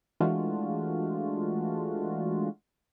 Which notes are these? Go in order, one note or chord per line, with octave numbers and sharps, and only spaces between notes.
E3 G#3 A3 D4 F4 F#4